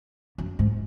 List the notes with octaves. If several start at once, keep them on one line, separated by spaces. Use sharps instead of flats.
F#2
G#2